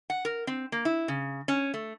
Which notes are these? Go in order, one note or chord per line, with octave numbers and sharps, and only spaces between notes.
F#5
A#4
C4
A#3
E4
C#3
C#4
A3